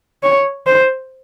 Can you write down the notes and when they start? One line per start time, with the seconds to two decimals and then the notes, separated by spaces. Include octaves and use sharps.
0.23 C#5
0.66 C5